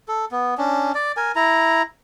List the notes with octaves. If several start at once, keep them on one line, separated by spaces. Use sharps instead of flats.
A4
B3
C#4 D4
D5
A#4 G#5
E4 A#5